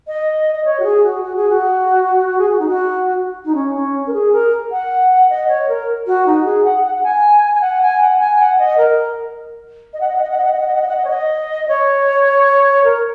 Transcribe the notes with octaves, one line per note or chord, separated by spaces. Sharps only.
D#5
D#5
C#5
F#4
G#4
F#4
F#4
G#4
F#4
G#4
F#4
D#4
F#4
D#4
C#4
C#4
A#4
G#4
A#4
F#5
D#5
C#5
A#4
F#4
D#4
G#4
F#5
F#5
F#5
G#5
G#5
F#5
G#5
F#5
G#5
F#5
D#5
A#4
D#5
F#5
D#5
F#5
D#5
F#5
D#5
F#5
D#5
F#5
D#5
F#5
D#5
F#5
D#5
C#5
D#5
C#5
A#4